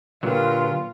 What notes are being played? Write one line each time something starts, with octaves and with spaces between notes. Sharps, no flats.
A#2 D3 F#3 F4 G4 A#4 B4